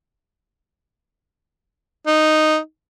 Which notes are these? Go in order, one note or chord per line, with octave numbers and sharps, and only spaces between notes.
D#4